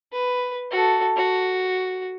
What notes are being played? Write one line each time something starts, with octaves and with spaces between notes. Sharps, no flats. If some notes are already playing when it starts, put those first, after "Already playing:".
B4
F#4 A4
F#4